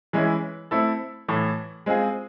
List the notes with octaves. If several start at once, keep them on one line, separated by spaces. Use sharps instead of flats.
E3 G#3 C#4 E4
A3 C4 E4 A4
A2 E3 A3
G#3 C4 F4 G#4